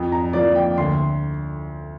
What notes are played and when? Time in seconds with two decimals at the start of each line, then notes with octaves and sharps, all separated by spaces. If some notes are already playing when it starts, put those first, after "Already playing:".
Already playing: F2
0.12 A#5
0.33 F3 A#3 D5
0.55 G5
0.78 D2 C6